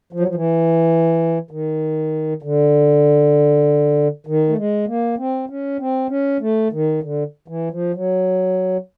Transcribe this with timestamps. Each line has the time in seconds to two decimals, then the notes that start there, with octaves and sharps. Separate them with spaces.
0.13 F3
0.20 F#3
0.28 F3
0.35 E3
1.51 D#3
2.43 D3
4.27 D#3
4.49 A3
4.58 G#3
4.88 A#3
5.18 C4
5.50 C#4
5.80 C4
6.10 C#4
6.40 A3
6.72 D#3
7.03 D3
7.48 E3
7.71 F3
7.95 F#3